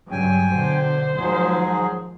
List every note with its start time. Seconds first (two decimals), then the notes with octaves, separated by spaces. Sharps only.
0.11 G2 C#3 F#3 G5 G#5
0.55 B2 D3 C5
1.17 G#2 D#3 F3 F#3 G#3 G#4